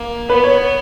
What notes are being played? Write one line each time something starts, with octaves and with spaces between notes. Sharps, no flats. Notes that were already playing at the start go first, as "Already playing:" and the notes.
Already playing: A#3
B3 B4
C#5
C#5